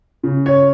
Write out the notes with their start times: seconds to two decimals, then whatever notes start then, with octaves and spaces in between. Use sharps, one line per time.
0.23 C#3
0.46 C#5